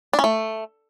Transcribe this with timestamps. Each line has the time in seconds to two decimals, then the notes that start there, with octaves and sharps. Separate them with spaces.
0.13 D4
0.19 C#4
0.24 A3